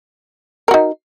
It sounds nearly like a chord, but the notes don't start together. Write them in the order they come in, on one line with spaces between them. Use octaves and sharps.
A#4 F#4 D#4